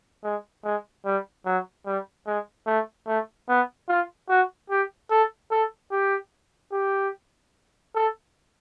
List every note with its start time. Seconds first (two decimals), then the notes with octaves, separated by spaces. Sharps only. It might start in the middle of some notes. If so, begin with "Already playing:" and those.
0.24 G#3
0.64 G#3
1.05 G3
1.46 F#3
1.86 G3
2.27 G#3
2.67 A3
3.07 A3
3.49 B3
3.89 F4
4.29 F#4
4.70 G4
5.11 A4
5.51 A4
5.91 G4
6.72 G4
7.95 A4